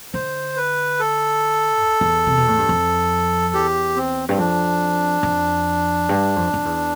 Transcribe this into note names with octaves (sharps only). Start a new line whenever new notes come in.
D3 C5
B4
A4
E2
E2
C3
B2
A2
G2
F2
E2 G4
C4
G2 C4
F2 D4
F2
G2
F2
F2
E2